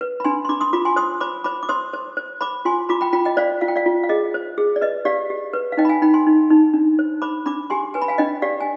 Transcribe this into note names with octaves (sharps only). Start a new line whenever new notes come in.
B4
B5
D4 G#5 C6
C6
D4 B5 D6
C6 D#6
F4 B5 D6
G#5 C6
C5 C6 D#6
C5 B5 D6
C5 B5 D6
D6
C5 C6 D#6
C5
C5
C5 B5 D6
F4 G#5 C6
F4 B5 D6
G5 B5
F4 G5 B5
D#5 G5
C5 D5 F5
F4 F5
G5
D5 F5
F4
F5
G#4 D#5
C5
G#4
D5
B4 D#5
G4 D5 F5
G4
B4
F5
D#4 D#5 G5
B5
F5 G#5
D#4 G5 B5
G#5 C6
D#4
D#4
D4
C5
C5 B5 D6
D4 B5 D6
G4 G#5 C6
B4 G#5
B5
F5 G#5
D4 D#5 G5
G4 D5 F5
G#5